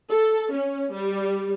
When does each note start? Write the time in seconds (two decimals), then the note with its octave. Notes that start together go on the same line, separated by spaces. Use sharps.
0.11 A4
0.52 C#4
0.93 G3